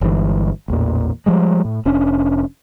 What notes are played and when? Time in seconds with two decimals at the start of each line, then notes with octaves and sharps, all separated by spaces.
0.01 G1 G2 E3 G#3
0.68 A1 E2 A#2
1.26 F3 G3 G#3
1.65 A2
1.85 F1 C#4 D4